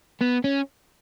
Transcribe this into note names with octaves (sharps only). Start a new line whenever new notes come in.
B3
C#4